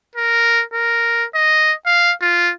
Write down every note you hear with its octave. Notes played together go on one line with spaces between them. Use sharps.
A#4
A#4
D#5
F5
F4